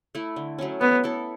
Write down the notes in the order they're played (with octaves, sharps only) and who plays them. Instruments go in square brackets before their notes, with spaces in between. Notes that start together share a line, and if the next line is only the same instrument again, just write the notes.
[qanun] A3 E4
D3
F#3 A3 C#4
[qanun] F#3 [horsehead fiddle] B3
[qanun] B3 E4 A4